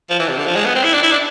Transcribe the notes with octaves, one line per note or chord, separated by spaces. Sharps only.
F3
E3
C3
D3
F3
G#3
B3
C4
E4
D4
E4
D4